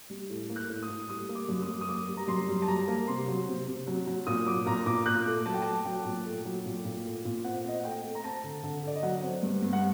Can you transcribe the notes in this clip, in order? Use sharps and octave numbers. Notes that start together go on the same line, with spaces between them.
G3
A2
A#3
F#6
A2
D#6
A2
G3 D#6
A#3
D6
F#2
D#6
F#2
D#6
A#3 D6
G3
A#5
F#2 C6
G3
A5
F#3 A#5
A#3
C3 C6
F#3
C3
C3
F#3
F#3
A#2 D#6
F#3 D6
A#2 A#5
A#2 D6
A#2 F#6
A3
F#3 A5
G5
A3 A5
F#3 G5
A#2
A3
F#3
A#2
A#2
A3
A#2
C4 F#5
C4 D#5
F#5
A3 G5
A3
A#5
C4 A5
D3
D3
D3 D5
D#5
F#3 F#5
C4
G2
G2
F#5